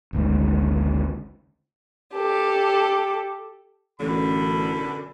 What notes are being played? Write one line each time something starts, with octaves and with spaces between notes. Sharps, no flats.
G#1 D2 G#2
G4 A4
A1 F#2 B2 D3 B5